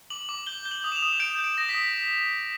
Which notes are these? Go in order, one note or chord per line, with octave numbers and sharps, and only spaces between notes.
D6 F#7
D6
G6 G7
G6
F#7
D#6
E7
F7
D#6
G6 D7
G6
D7
D#6 A#6
B6
D#6